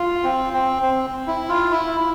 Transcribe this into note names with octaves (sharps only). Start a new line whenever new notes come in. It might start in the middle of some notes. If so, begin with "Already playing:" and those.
Already playing: F4
C4
C4
C4
E4
F4
E4